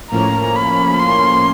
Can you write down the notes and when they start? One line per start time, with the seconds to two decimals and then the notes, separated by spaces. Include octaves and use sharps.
0.11 A2 F3 A#3 C#4 A#5
0.55 B5
0.99 C6